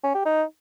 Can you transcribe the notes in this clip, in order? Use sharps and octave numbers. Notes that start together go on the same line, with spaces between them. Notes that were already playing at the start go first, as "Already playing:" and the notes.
C#4
G4
D#4